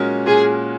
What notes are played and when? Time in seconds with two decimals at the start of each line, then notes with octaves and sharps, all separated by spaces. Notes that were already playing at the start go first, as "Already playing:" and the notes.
Already playing: A#2 G#3 C#4 F#4 A#4
0.26 A#2 G#4